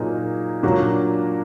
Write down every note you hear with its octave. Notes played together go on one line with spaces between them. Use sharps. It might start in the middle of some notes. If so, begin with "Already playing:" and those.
Already playing: A#2 F#3 A#3 D#4 G#4
A#2 F#3 A#3 D4 F#4